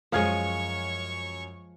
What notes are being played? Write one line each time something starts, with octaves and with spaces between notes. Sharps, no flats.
F#2 F3 G#3 C#5 C#6 F6 G#6